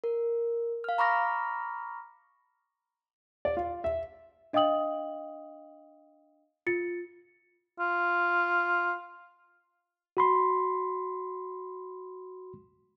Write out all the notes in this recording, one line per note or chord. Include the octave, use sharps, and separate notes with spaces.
A#4
F5 F6
A#5 B5 C#6 D6 F6 A#6
D5
F4
E5
D4 D#5 F5 G5 D#6 F#7
F4 A6 C#7
F4
F#4 B5 C6